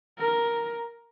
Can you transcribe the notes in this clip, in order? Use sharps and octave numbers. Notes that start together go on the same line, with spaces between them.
A#4